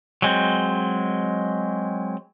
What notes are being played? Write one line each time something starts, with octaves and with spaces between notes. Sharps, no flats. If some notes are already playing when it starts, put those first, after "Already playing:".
F#3 G#3 C4